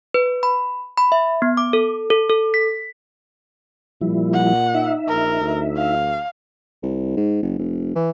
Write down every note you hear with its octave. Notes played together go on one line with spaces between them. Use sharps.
B4
B5
B5
E5
B3
D6
A4
A4
A4
B6
A#2 F3 G3 E4
F#5
D#4 E5
A#1 A#4
D2
F5
C2
G#2
F#1
F1
E3